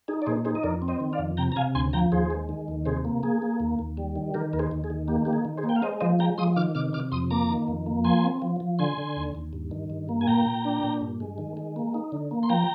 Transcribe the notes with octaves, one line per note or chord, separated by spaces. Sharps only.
D#4 G#4
D5
A#2 G#4 C5
D#4 G#4 C5
D#5
F2 A#4 D5
C4
C5 D#5
D#3
D5 F5
F2
C3 G5 A#5
A#5
C3 F5 G#5
D2 G#5 C6
F3 G5 A#5
D#2 G#4 C5
G#3
D#3
D#2
C3 G#4 C5
A#3
A#3 G#4
A#3
D#2
D#2
G3
D#3
D#3 G4 A#4
D#2 A#4
G#4 C5
D#2
G#4
D#3
A#3 G4
A#3 G4
G#4
D#3
G#4 C5
A#3
G5
F5
G#3 C5 D#5
F3 C5 D#5
G#3 G5 A#5
F3 C6 D#6
D#3 D6 F6
C3 D6 F6
C3 D6 F6
F2 C6 D#6
A#3 A#5 D6
D#3
F2
A#3
F3 G#5 C6
C4
F3
F3
D3 G#5 C6
D3
D#2
D#2
G2
D#3
G2
A#3
G#5
A#2 G5 A#5
A#2
D4
A#2
G2
G#3
D#3
G#3
A#3
D#4
D3
A#3
C6
F3 G5 A#5